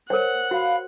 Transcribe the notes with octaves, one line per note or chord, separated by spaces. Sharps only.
A#4 C5 C#5 F#5
F#4 F5 B5